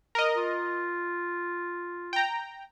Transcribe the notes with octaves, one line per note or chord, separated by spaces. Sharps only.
A#4 D#5
F4
G5 A#5